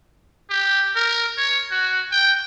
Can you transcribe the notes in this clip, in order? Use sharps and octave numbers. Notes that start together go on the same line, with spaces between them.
G4
A#4
C#5
F#4
G5